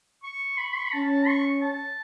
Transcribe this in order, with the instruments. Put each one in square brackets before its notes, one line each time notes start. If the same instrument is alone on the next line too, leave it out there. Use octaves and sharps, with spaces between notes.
[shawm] C#6
B5
C#6
B5
[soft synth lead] C#4 [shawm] A5
[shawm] C#6
A5